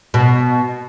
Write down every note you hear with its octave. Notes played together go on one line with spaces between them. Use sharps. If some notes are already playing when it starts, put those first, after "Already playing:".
B2